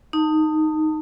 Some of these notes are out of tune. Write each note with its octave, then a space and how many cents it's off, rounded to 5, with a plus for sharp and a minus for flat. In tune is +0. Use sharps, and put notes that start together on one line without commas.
D#4 +0 A5 +30